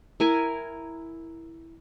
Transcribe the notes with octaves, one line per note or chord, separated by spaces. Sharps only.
E4 A#4 G#5